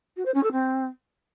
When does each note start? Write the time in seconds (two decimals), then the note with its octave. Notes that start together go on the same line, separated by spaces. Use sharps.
0.16 F#4
0.25 C5
0.34 C#4
0.43 A4
0.52 C4